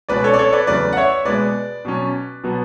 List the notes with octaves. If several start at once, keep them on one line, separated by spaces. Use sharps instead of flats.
C#2 B2 G#3 C#4 B4 D5
A4 C#5
D5
A4 C#5
B4 D5
E2 C#3 F#3 A3 B4 D5
F#5
C#5 E5
B2 G#3 B3 B4 D5
B2 F#3 C#4
B2 F#3 B3